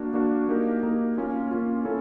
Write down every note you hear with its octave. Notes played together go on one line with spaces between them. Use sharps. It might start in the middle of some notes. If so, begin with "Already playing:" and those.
Already playing: A#3 D4 F#4
A#3 D4 F#4
A#3 D#4 G4 A#4
A#3 D#4 G4 A#4
A#3 C#4 F4
A#3 C#4 F4
A#3 C#4 E4 A4